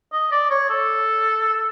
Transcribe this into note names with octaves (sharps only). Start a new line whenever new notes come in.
D#5
D5
C#5
A4